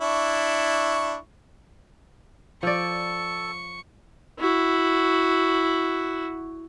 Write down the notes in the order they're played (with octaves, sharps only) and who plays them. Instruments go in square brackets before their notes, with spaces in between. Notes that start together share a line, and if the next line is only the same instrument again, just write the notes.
[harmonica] D4 E4 C#6
[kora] F3 D5 [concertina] A4 [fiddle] C#6
[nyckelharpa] E4 F#4